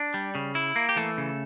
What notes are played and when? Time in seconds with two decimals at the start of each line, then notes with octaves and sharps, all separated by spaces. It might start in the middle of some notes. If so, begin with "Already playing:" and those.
Already playing: D4
0.14 G3
0.35 C#3
0.55 E4
0.76 A#3
0.89 G4
0.96 E3 A3 A4
1.18 C#3